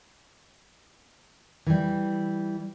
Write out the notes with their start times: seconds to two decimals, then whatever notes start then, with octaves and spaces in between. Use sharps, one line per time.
1.66 E3 G3